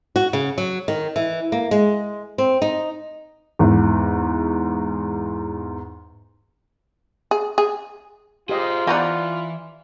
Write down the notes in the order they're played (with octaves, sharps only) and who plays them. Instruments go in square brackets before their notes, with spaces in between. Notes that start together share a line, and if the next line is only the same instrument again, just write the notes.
[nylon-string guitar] F#4
C#3
F#3
D#3
E3
A#3
G#3
C4
D#4
[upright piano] E2 G#2
[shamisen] G#4
G#4
[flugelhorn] F4 [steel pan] G4 D#5 [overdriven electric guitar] G#4 C5
[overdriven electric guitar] E3 [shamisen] F3 B3 D#4 [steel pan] D5 F#5 A#5